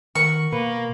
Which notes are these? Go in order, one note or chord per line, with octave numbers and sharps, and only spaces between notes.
D#3 A#4 F#5 C#6
B2 A#3 B4